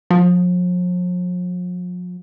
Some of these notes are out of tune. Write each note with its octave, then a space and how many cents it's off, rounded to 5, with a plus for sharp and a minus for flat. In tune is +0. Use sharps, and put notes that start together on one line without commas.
F3 +45